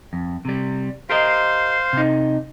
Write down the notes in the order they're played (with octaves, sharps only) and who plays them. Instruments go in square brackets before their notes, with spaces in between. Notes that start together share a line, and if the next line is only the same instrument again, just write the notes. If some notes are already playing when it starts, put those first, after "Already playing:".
[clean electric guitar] F2
C3 G3
[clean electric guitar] G4 A#4 D#5 [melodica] C5 F5 C6
[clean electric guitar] C3 D#4